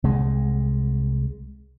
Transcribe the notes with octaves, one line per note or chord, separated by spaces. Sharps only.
C2 G#3